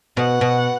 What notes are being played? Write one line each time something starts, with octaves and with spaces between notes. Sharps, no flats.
B2 F#5
B2